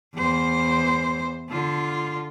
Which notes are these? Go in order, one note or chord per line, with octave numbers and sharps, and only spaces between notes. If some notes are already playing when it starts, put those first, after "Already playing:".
E2 C5
D3 F4